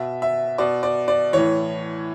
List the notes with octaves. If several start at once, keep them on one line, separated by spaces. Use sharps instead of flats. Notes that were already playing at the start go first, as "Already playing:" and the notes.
Already playing: B2 E5
E5
B2 D5
D5
D5
A2 E3 C#5